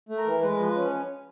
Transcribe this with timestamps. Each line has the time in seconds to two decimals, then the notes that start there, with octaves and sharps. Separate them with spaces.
0.09 A3
0.17 A#4
0.25 E3
0.42 G#3 B4
0.58 F3
0.75 C#4